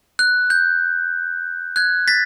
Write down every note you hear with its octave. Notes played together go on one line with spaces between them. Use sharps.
F#6
G6
F#6 G#6
A6 B6